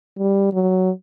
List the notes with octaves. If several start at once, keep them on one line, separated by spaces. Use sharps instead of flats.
G3
F#3